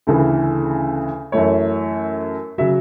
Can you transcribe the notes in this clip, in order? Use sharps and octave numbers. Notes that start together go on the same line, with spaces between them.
D2 C#3 E3 A4
F#2 E3 A3 C#5
C#3 F#3 E5